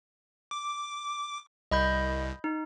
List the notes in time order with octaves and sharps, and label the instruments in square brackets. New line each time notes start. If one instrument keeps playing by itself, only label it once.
[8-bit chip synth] D6
[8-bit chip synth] C2 [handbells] D#5 B5 G6
[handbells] D#4